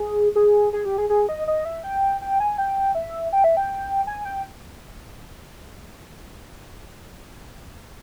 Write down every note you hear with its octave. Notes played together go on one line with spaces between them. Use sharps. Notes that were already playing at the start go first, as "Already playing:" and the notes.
Already playing: G#4
G#4
G#4
G4
G#4
G#4
D#5
D#5
E5
G5
G5
G#5
G5
E5
G5
E5
G5
G#5
G5